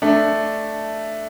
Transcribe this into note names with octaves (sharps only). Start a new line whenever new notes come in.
A3 D4